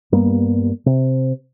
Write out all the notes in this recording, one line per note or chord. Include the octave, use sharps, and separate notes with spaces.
G2 G3 A#3 B3
C3